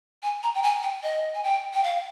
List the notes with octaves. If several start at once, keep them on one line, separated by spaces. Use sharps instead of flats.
G#5
A#5
G5
G#5
G5
D#5
G#5
G5
G5
F5